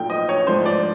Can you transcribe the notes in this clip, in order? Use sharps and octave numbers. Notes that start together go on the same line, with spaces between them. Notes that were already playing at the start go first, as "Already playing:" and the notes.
Already playing: B1 A#2 F3 A3 G5
D#5
C#5
G#2 F3 A3 D4 C5
D5